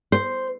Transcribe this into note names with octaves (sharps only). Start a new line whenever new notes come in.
C5